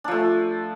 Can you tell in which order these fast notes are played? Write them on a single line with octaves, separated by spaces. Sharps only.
D4 F3 A3